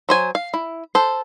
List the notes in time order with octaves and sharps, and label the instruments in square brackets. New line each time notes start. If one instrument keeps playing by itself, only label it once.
[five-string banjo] F#3 C5 G#5
F5
E4
A4 C5